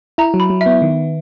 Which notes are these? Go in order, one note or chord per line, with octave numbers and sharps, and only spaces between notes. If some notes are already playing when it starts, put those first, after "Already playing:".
E4 A#5
F#3
B5
F#3
E5
B3
D#3